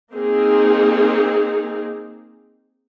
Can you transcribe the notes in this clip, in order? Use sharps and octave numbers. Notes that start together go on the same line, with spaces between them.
A#3 C4 D#4 G#4